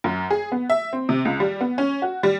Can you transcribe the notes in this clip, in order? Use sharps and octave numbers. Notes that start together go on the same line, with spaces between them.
F#2
G#4
B3
E5
C4
C3
C#2
G3
B3
C#4
F#4
G3